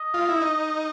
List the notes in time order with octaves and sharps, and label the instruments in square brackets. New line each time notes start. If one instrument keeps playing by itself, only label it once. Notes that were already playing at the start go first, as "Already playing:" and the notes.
Already playing: [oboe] D#5
[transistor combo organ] F4
E4
D#4